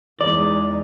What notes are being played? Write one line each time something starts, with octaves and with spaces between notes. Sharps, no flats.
E2 G#3 D#4 D5